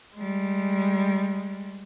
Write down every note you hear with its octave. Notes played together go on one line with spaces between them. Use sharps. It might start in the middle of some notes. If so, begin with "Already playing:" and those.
G3 G#3